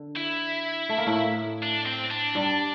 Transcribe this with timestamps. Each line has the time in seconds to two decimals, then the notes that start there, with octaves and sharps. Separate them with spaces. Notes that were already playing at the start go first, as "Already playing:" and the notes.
Already playing: D3
0.16 E4
0.89 A3
0.98 A#3
1.06 A2 A3
1.63 D4
1.86 C4
2.11 D4
2.35 G2 G3